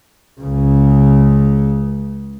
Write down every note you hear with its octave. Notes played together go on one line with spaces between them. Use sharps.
C#2 C#3